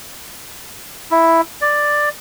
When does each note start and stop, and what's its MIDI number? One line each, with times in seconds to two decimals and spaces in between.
1.11 1.41 64
1.61 2.09 74